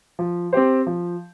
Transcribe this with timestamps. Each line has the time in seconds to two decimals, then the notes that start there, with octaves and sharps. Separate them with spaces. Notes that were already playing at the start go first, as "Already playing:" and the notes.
0.19 F3
0.53 C4 G4 C5
0.87 F3